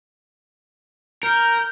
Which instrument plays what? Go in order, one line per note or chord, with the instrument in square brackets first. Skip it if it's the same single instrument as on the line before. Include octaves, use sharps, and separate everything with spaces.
[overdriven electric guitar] A#4 [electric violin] F6 G6